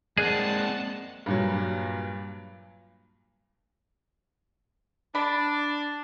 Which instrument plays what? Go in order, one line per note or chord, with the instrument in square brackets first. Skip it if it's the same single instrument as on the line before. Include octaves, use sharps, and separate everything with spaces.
[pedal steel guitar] G#3 D5 F#6 [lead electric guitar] A#3 C4 [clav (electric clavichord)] G#4 [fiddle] F#5 A5
[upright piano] G2 A#2 F#3
[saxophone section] D4 [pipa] B5